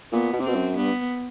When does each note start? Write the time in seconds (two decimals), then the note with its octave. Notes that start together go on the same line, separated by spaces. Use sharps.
0.12 A#2 B3
0.33 B2
0.40 C3
0.44 B2 C4
0.55 F#2
0.76 G2 B3